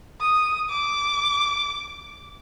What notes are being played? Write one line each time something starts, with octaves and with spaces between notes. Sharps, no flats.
D#6
D6